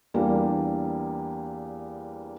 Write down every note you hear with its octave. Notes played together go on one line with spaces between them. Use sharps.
E2 G3 A#3 D4